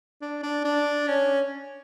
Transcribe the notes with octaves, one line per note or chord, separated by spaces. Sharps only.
D4
D4
D4
C#4